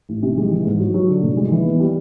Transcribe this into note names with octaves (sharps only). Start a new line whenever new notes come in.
A1
C3
G#3
E3
G#2
F#3
F#3
D3
F1
G#3
E3
B3
G3